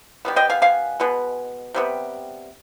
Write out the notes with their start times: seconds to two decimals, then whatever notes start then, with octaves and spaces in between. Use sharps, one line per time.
0.25 D#3 G3 B3
0.36 D#5 G5
0.50 F5 G#5
0.62 F5 G#5
1.00 B2 G#3 B3
1.74 C3 G3 B3